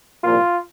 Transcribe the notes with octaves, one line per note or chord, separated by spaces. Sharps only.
C2 A#2 F3 A#3 F4